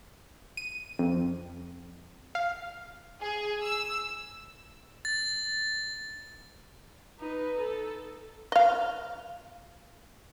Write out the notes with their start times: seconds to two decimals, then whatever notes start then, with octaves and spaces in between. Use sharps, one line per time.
0.57 D#7
0.99 F2
2.35 F5
3.21 G#4
3.62 E6
5.05 A6
7.20 D#4 B4
7.59 A4
8.52 D#5 F5